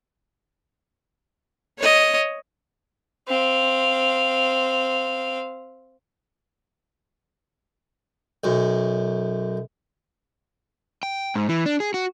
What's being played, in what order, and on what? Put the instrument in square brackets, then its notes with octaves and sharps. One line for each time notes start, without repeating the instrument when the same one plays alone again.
[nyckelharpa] C#5 D#5
[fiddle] C4 F5
[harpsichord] B1 F#2
[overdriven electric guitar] G5
G#2
E3
D4
G#4
F#4